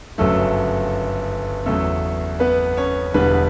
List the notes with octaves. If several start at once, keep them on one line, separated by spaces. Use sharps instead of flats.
G1 F#2 C#3 F#3 A3 A4
E2 C#3 F#3 A3 A4
B3 B4
C#4 C#5
E1 E2 D3 G3 B3 B4